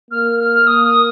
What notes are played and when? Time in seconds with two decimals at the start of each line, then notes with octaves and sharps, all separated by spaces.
0.11 A#3 F6
0.39 F6
0.66 A#3 D#6
0.85 D#6